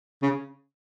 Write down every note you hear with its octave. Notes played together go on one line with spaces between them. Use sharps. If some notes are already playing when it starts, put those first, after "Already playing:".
C#3